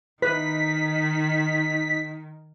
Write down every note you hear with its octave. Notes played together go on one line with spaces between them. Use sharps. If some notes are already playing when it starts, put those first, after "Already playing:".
D#3 D#4 B4 B6